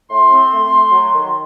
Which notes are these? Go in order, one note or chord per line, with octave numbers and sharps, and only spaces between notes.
A2 C6
C4
A3
A3
F#3
D#3